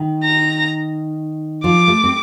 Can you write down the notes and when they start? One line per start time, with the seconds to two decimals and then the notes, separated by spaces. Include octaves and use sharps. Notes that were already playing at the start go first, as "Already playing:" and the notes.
Already playing: D#3
0.24 A#5
1.64 F3 D6
1.87 A3
2.04 C4